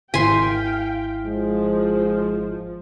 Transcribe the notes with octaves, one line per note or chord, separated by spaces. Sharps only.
G#1 E4 F5 G5 G#5 C6 B6
F3 G#3